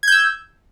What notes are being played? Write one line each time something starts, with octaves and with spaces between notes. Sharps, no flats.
E6 G6 G#6